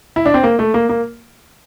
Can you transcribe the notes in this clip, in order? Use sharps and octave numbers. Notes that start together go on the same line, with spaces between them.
E4
D4
C4
A#3
A3
A#3
A#3